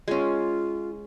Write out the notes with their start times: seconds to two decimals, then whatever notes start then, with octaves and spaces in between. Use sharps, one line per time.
0.08 G#3 C#4 F4